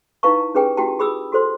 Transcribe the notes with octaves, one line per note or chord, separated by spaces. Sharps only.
D#4 E4 B4 F5 A5 C#6
C#4 G4 G#4 B4 G5 G#5
E4 F#4 G4 G5 A5
G4 G#4 B5 D#6 E6
F#4 A4 C5 C6